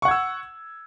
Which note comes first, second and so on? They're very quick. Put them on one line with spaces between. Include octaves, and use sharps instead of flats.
C#6 F#5 G#6 E6